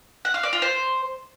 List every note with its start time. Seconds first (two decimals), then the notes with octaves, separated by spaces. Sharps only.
0.25 F#5
0.34 F5
0.43 D5
0.53 F4
0.62 C5